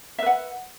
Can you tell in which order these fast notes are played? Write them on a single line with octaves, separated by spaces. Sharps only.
E5 B4 F#5